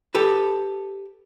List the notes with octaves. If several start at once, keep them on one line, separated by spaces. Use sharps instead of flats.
G4 A4 B4